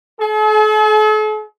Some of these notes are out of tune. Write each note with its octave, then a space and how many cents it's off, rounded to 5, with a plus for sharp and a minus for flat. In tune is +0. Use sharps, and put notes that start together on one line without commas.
A4 -45